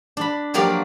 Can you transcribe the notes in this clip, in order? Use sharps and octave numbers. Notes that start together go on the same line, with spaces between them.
D4 B5
F3 F#3 A#3 G4 D5 F5